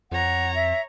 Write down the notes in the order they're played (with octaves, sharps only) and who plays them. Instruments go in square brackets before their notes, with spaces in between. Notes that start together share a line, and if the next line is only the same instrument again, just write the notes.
[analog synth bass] F2 [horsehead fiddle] C#5 A#5 [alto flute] F#5
[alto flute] E5